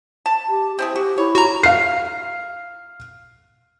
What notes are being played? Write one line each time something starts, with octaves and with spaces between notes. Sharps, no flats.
A5
G4
C4 E4 G#4 C5
F#4 G4
E4 C#5
F#4 A#5
F5 C7